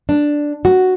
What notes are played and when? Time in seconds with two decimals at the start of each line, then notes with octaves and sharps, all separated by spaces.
0.09 D4
0.65 F#4